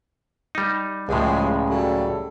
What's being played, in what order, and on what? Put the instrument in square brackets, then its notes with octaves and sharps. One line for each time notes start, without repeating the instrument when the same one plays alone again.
[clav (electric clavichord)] G3 D#4
[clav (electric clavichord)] C#2 A2 [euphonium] C#3 [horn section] F3 G3 G#3
[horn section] F#3 G3 A4